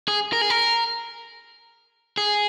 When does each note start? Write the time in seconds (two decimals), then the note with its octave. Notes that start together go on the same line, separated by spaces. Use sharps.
0.08 G#4
0.33 A#4
0.41 G#4
0.50 A#4
2.17 G#4